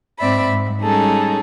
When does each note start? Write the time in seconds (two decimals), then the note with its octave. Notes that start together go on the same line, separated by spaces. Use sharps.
0.19 G#2 C4 D5 E5 B5
0.49 G#2
0.81 G3 G#3 C#4 D#4 G#4 A4